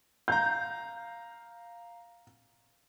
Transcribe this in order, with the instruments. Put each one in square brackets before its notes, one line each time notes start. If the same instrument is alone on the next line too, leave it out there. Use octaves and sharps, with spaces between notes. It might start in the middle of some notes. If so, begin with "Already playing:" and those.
[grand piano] F5 A#5 [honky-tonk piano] G6